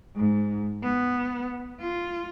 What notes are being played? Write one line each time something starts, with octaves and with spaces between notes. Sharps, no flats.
G#2
B3
F4